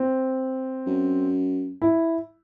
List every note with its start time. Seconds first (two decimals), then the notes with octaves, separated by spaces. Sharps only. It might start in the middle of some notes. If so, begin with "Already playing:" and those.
Already playing: C4
0.87 F#2
1.82 E4